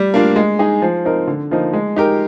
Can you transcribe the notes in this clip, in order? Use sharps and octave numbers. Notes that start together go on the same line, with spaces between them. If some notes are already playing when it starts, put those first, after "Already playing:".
Already playing: G3
A#3 D4 F4
G#3
D#4 G#4
F3
C4 D#4 A#4
D3
F3 A#3 D#4
G#3
D#4 G4 A#4